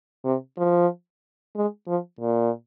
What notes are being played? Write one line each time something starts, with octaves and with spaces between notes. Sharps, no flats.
C3
F3
G#3
F3
A#2